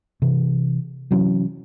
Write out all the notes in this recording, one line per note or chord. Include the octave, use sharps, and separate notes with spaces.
C3 E3
C3 E3 F#3 C#4